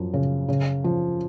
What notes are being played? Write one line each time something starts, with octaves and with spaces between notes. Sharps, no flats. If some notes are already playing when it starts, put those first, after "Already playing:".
Already playing: F#2 F3
C#3
C#3
F3